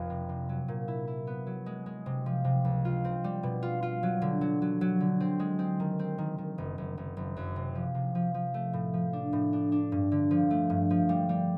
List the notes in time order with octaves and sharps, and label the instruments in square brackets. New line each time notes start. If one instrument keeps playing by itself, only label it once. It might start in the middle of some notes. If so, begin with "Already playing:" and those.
Already playing: [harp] F1 F2 F3
C3
C3
F#3
A#2
E4
E4
B3
F#3
G#3
G#3
C3
F3
C3
C#2
F4
C4
G3
B2
F4
F4
F#3
D3
F#3
F#3
F#3
D3
C4
G#3
C4
D#3
C4
D#3
D#3
F#1
F#1
F#1
F#1
F#2
C3
F3
C3
F3
F3
A3
A2
F3
D4
A2
D4
D4
G2
D3
F3
A3
G2
F3
G3
G3